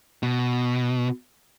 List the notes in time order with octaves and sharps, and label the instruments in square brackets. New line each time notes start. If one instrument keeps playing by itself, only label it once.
[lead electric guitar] B2